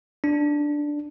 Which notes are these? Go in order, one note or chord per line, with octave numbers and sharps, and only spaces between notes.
D4